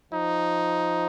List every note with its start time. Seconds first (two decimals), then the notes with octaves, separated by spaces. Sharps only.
0.13 F3 D#4